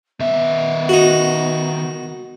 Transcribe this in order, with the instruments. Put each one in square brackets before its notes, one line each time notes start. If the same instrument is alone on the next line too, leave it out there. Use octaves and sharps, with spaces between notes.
[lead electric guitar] D#3 E5 [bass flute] B3
[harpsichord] D#4 F#4